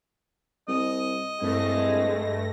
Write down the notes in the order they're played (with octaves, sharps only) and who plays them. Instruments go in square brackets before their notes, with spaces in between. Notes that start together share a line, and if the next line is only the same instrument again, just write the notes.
[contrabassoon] C2 [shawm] D#5
[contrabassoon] C2 [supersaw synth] G2 A3 A#6 [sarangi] G#3